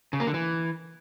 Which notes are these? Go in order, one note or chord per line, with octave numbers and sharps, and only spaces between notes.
C#3
A#3
D3
E3